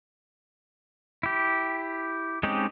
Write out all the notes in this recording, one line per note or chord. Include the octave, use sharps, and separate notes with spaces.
E4 G4
G#3 C4 C#4 D#4 G4